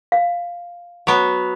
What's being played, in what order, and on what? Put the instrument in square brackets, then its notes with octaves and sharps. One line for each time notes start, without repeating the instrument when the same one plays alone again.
[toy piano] F5
[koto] F#3 B3